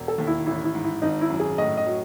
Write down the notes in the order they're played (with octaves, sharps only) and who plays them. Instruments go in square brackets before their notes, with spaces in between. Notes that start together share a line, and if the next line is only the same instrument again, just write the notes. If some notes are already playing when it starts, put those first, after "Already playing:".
Already playing: [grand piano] E1
[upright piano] A4
[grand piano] D#2
[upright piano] E4
[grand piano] A1 [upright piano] E4
[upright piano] E4
[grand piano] G#2
[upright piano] E4
[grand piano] G#1 [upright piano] D#4
[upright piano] E4
[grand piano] F#2
[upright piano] G#4
[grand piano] A2 [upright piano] D#5
[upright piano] D#5
[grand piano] F#3